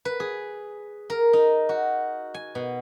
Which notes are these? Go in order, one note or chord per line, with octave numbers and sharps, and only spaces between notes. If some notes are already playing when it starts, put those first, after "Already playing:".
B4
G#4
A#4
D#4
F#4
G#5
B2